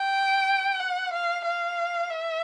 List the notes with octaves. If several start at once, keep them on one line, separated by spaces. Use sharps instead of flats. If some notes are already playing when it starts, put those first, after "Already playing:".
Already playing: G5
F#5
F5
F5
E5